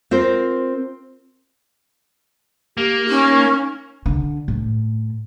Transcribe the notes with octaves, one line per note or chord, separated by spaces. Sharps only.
C4 F4 A#4 C5
A#3 G4
C#4 D#4
D3
A2